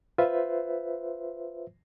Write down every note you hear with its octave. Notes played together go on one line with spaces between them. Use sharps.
F4 B4 C5 E5